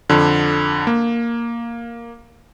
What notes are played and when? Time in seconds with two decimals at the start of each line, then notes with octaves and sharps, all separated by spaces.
0.09 F2 D3
0.87 A#3